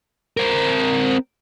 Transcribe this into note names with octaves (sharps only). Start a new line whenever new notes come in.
C4 A#4